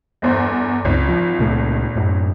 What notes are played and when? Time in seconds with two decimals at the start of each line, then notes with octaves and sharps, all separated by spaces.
0.22 G1 E2 C5
0.85 G#1 C#2
1.09 F3
1.39 C#2 A#2 A3
1.96 F#2 A2